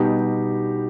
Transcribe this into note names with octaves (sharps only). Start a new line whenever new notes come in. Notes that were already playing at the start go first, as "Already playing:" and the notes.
Already playing: B2 G3 B3 D#4 G4